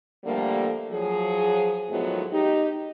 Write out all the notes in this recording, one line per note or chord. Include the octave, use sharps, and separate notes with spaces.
D3 F3 G3 A3 A#3
F3 F#3 G#4
A2 D#3 F3 F#3 G#3 B3
D#4 G4